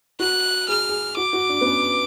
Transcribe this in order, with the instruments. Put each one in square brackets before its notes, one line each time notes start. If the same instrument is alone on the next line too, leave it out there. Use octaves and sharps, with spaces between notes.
[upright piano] F#4 [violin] F#6
[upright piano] G#4 [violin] F6
[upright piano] G#4
[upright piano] F#4 [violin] D6
[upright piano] F#4
D4
B3
C#4